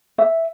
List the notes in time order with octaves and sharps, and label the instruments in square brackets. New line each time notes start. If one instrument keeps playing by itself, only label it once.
[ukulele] E5